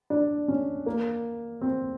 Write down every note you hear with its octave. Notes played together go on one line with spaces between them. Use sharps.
D4
C#4
A#3
C4